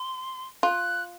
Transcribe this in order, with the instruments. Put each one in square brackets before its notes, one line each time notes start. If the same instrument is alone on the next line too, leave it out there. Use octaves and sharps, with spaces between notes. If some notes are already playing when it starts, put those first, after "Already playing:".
Already playing: [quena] C6
[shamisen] F4 [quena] F#6